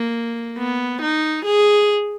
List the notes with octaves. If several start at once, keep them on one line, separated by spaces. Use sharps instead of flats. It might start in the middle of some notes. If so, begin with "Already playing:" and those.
Already playing: A#3
B3
D#4
G#4